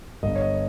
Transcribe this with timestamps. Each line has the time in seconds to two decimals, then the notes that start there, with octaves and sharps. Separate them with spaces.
0.23 G1 G2 G3 D#5
0.35 C#5
0.42 D#5